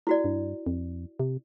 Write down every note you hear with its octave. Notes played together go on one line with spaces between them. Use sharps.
E4 F#4 D5
G2
F2
C3